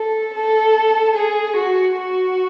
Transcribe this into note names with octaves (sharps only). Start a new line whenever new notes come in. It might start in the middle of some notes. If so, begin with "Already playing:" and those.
Already playing: A4
A4
G#4
F#4
F#4